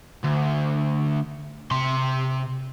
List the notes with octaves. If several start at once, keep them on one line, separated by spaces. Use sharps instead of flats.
D2
C3 C6